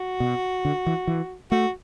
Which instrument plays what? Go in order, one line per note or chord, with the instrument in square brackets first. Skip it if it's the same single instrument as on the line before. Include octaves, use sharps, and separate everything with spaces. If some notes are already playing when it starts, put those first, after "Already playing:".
Already playing: [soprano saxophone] F#4
[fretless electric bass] B2
D3
E3
E3
[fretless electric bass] A3 [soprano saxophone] F#4